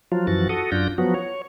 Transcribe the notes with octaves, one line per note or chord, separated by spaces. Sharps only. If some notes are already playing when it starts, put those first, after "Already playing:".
F3 F#3 F4
F#2 E3 F3 F#4 A6
F#4 A4 D#6
F#2 D4 F4 G6 A#6
F3 F#3 B3 F#4
C#5